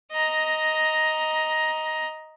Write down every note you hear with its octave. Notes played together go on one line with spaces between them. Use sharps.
D#5 A#5